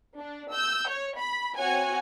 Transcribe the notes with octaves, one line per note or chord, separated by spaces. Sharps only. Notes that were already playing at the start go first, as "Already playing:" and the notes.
D4
E6 G6
C#5
B5
C4 F#4 C#5 F#5 G#5